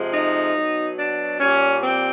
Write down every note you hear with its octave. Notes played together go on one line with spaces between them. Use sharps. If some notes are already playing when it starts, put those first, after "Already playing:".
Already playing: C3 F3 G#3
D#4
B2 F#3
D4
A#2 G3 C#4
C4